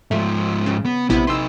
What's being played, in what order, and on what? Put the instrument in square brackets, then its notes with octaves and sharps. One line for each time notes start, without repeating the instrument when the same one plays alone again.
[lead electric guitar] G#2 F3 [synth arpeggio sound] A3
[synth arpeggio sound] C#3
[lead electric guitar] B3
[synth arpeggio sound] A#1 C3 E4 [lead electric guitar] B3
[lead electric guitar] D#4 B4 [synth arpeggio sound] C6 E6